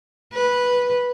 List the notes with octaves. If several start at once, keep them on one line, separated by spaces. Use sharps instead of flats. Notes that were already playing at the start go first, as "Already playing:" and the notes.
B4